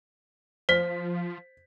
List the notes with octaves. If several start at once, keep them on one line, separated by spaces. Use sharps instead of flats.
F3 C5 B6